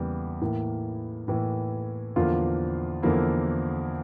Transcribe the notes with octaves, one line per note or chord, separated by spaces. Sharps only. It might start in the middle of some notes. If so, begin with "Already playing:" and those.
Already playing: E2 C#3 E3 G3 A#3
A2 E3 A#3
A2 E3 A#3
E2 D3 F3 A#3 F4
E2 D3 F3 A#3 E4